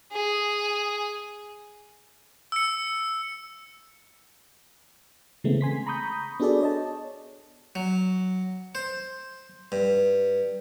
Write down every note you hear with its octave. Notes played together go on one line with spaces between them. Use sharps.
G#4
E6 C#7
C#3 E3 G#3 A3 B3 C4
G#5 C6 B6
A#5 B5 C#6 D#6 G6
B3 D4 F#4 G#4 A4 D5
C#5 D#5 A5
F#3
C5
G2